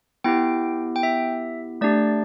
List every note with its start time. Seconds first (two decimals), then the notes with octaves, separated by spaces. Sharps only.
0.24 B3 E4 G4 G5
0.96 G5
1.03 E5
1.81 A3 D4 G4 D5